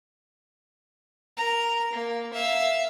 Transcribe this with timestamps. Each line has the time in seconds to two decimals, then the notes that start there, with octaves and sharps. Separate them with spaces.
1.37 A#4 A#5
1.93 A#3
2.33 E5 F5